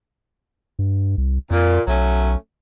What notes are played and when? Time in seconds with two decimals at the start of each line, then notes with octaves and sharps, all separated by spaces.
0.79 G2
1.18 C2
1.51 F2 A#2
1.87 B1 F#3 A3 C#4